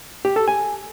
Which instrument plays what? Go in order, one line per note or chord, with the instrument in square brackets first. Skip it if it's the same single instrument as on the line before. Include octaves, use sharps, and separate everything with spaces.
[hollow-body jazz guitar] G4
A4
G#5